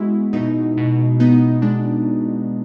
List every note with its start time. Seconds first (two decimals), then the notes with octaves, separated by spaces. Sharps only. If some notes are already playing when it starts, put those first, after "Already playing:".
Already playing: G#3 B3 E4 F#4
0.33 B2 D#4
0.77 B2
1.20 B3 D#4
1.62 G#3 D4